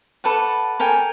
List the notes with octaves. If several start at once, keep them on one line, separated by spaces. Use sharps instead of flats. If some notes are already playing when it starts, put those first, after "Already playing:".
A4 B4 D5 F#5
A4 A#4 G5 G#5